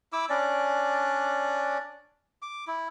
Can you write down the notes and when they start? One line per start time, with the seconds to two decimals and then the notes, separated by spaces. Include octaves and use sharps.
0.13 E4 D6 E6
0.30 C#4 D4 D5
2.42 D6
2.67 E4